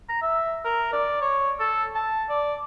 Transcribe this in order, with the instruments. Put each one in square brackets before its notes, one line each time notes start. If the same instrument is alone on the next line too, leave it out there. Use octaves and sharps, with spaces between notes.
[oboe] A#5
E5
A#4
D5
C#5
A4
A5
D5